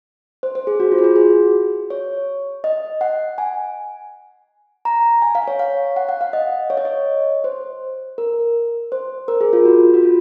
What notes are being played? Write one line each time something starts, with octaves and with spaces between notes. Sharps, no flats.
C5
C5
G#4
F#4
F4
G#4
F#4
G#4
C#5
D#5
F#5
G#5
A#5
G#5
F5
C#5
F5
F#5
F#5
F5
D#5
C#5
D#5
C#5
C5
A#4
C5
A#4
G#4
F4
F#4
F#4
F4